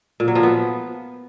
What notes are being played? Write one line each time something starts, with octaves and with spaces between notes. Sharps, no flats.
A#2
F#3
F3
B3